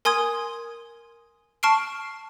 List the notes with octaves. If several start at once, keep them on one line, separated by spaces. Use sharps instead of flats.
A#4 G#5 C6 D#6 G#6
A5 C#6 F6 C7 D7